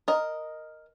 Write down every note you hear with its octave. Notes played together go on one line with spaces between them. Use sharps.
A#4 D#5